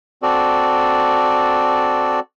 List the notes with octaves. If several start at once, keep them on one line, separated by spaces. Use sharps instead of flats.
C4 F#4 A4 D5